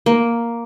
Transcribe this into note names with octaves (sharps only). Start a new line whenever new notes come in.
A#3